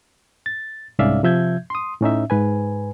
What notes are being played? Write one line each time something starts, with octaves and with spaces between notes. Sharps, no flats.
A6
C2 G#2 C#4 D5 E5 F5
C3 F3 E5 G6 G#6
C6 D#6
A2 C#4 D#4 E5
G#2 B4 G#5